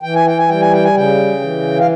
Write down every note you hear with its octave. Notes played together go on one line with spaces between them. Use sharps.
E3 G5
G#5
G5
G#5
G3 G5
G#5
G5
G#5
C#3 G5
E3
F5